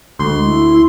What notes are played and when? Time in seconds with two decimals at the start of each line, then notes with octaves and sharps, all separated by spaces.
0.19 D2 G#3 C6
0.44 E4